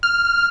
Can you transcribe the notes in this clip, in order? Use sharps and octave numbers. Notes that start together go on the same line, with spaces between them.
F6